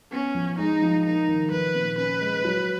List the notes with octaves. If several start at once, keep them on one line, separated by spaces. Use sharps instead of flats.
B3 C#4
F3
G#3 D#4
F3
A#3 D#4
D#3
F3 B4
A#2
C#4 B4
G#3
F#3